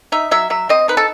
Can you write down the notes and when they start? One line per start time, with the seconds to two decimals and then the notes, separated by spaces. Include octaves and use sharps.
0.12 D#4 E5
0.31 F#3 E5
0.50 F#3 E5
0.69 C4 D#5
0.88 D#4 B4
0.97 A4